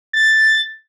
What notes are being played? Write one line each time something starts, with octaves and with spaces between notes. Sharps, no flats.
A6